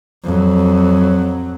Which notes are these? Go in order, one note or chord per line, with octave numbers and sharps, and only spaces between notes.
F2 F#3